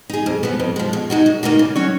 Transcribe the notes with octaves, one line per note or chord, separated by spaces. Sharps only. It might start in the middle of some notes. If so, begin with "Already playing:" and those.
D#4 G#4
F2
F3 B3
F2
F3 G#3
B2
G#3 D#4 F#4
F#2
D#3 A#3 D#4 F#4
C#3
F#3 C#4 F#4 C#5